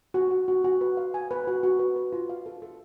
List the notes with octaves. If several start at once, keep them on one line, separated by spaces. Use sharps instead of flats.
F#4
F#4
F#4
F#4
B4
F5
G#5
B4
F#4
F#4
B4
B4
F4
F5
A4
A4